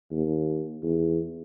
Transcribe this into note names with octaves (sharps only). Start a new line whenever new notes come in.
D#2
E2